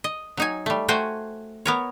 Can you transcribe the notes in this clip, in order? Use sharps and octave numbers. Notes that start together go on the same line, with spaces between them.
D#5
F#3 D#4 G#5
G3 A3
A3 F#4 C5 G5 G#5
B3 A#4 C#5